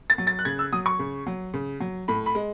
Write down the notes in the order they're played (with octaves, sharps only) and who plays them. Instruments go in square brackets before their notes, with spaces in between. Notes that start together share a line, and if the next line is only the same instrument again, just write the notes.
[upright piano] A6
F#3
A6
F#6
C#3 G#6
E6
F#3 D#6
C#6
C#3
F#3
C#3
F#3
A2 B5
B5
G#3